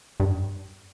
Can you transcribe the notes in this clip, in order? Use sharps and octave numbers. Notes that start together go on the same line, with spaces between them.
G2